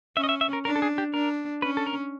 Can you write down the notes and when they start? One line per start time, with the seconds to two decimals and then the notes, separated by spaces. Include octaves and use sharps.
0.17 C#4 E5
0.24 D#5
0.29 E5
0.41 E5
0.53 A#4
0.65 D4 A#4
0.76 A4
0.82 G#4
0.98 G4
1.14 D4 A#4
1.62 C#4 B4
1.77 A4
1.86 A#4